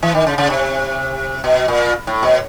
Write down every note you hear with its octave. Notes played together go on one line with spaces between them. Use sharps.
E3
D#3
C#3
C#3
C3
B2
A#2
A2
B2